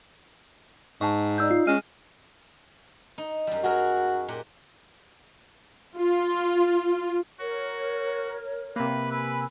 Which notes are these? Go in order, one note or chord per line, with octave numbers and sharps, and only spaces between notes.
G#2 D#5 A5 C#6
D#4 D5 E6 G6
F4
G#3 C#4 D#5 F6 D#7
D#4
F#2 G3
F#3 F#4 G#4 A#4
A#2 G4 F#5
F4
F#4 A#4 C#5
C3 A#3 B4
B4 G#5 B5 E6